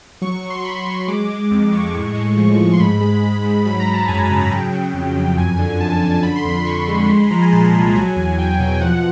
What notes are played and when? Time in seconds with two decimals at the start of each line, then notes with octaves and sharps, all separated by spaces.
0.22 F#3 C#6
0.37 C#6
0.43 F#3
0.50 C6
0.65 F#3 B5
0.86 F#3 C#6
1.08 G#3 D6
1.29 G#3
1.51 F2 D6
1.72 G#3 C#6
1.93 A2
2.15 G#3
2.37 F3
2.57 G#3
2.73 C6
2.80 G#2 B5
3.01 G#3
3.23 G#3
3.44 G#2
3.65 F#3 B5
3.80 A#5
3.87 F#3
3.94 A5
4.08 F#2 G#5
4.30 C#3
4.51 F#3 G5
4.72 F#3
4.94 F2
5.16 F2
5.37 F#2 G#5
5.59 D3
5.80 F#2 A5
6.01 D3
6.23 D3 B5
6.36 C6
6.45 F2 B5
6.66 D3 C#6
6.88 G#3
7.10 G#3 C6
7.20 B5
7.30 F3 A#5
7.42 G#5
7.52 A#2 A5
7.74 C2
7.95 F#3 G#5
8.16 E2 G#5
8.38 E2 G5
8.60 B2
8.81 F3 F#5